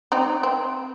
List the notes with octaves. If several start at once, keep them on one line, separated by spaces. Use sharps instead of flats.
C4 D#4
C4